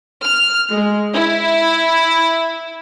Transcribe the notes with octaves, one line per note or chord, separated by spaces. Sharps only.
F6
G#3
E4